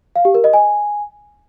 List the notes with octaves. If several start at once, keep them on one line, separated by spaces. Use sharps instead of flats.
F5
G4
A#4
D#5
G#5